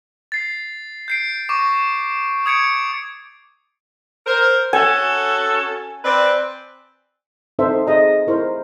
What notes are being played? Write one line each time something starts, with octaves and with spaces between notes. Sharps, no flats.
A6 C7
G6 C7 D7
C#6 D6
D#6 G#6 C#7 D7
A#4 C5
C#4 F#4 A4 G#5
C4 B4 D5
C4 D#4 A4 C5 E5
G#4 D#5 A#5
E4 A#4 C5